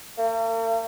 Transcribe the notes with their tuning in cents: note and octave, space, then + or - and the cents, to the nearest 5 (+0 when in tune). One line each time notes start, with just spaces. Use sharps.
A#3 -45